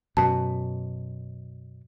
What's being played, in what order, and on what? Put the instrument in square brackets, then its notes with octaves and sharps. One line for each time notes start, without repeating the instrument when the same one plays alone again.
[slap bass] F#2 B2 [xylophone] A5